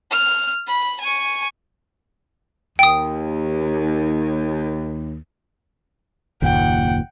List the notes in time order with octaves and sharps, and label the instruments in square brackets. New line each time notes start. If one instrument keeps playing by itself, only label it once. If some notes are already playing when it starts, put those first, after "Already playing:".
[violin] F6
B5
G#5 C#6
[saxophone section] D#2 [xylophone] G5 D#6
[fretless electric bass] F#1 D#2 A#2 [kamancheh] F#5 G5